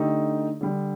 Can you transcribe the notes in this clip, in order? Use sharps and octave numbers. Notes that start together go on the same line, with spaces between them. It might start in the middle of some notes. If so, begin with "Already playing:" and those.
Already playing: D3 A3 D#4 G4
D3 G3 D4